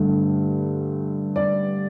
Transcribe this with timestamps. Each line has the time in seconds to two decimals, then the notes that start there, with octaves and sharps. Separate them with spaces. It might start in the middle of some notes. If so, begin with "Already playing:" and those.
Already playing: G2 D3 A3
1.36 D5